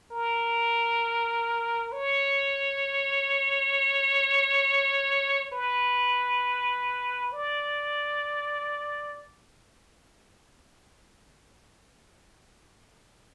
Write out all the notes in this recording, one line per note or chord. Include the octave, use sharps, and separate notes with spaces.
A#4
C#5
B4
D5